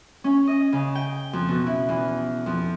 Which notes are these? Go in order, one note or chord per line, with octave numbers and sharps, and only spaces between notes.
C#4
D#5
C#3
G5
F2
B2
E4
E2
F2